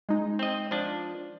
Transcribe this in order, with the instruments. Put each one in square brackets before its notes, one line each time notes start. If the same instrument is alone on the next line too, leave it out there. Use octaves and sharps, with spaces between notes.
[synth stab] G#3 D#4
[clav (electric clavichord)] C4 D#5
F3 D4